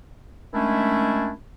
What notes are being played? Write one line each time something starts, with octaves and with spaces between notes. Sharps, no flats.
D#3 G#3 A3 C#4 D4 E4